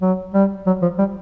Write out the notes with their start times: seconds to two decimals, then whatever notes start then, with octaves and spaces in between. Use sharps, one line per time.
0.02 F#3
0.34 G3
0.67 F#3
0.82 F3
0.99 G3